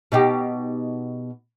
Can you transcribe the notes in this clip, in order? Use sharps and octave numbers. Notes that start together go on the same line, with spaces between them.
B2 D#4 G4